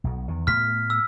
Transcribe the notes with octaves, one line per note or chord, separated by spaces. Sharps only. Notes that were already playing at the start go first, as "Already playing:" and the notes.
B1 B2
E2 D#3
A2 A3 B3 F6 B6
E6